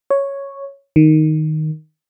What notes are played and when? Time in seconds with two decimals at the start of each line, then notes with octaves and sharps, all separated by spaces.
0.10 C#5
0.96 D#3